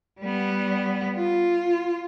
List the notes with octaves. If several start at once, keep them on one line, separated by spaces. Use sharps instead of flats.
G3 B3
F4